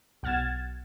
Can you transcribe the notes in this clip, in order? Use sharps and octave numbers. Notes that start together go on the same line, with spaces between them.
B1 F#5 F6 G#6 A6 E7